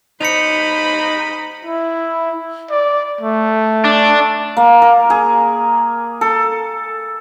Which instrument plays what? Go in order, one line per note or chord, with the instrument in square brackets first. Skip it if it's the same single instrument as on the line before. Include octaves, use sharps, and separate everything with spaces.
[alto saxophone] D#4 [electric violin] C5 B5 [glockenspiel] C#7 F7
[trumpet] E4
D5
A3
[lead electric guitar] D4
[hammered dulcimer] A#3
A#4
G#4
A4